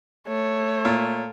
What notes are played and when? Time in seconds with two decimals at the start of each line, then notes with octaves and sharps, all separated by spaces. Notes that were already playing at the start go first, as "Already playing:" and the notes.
0.28 A3 C#5
0.85 A#2